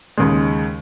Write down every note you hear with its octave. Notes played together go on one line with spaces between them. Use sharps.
D#2 C#3 G#3